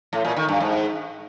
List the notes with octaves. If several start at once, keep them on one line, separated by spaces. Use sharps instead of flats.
A2
A#2
D#3
G2
G#2